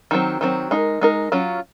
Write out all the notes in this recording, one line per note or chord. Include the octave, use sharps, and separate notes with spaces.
D#3 F#3 C4
D#3 F#3 C4
G#3 D#4 A#4
G#3 D#4 A#4
F#3 C#4 F4